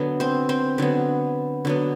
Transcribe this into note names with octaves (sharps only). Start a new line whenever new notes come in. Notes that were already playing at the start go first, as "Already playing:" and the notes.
Already playing: D3 F#3 B3
C4 C5
C4 C5
D3 F#3 B3
D3 F#3 B3